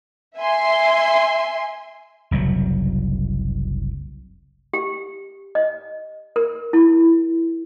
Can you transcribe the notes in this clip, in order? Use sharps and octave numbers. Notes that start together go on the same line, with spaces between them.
E5 G#5 C6
F#1 C2 F#2 F#3
G4
D#5
A#4
E4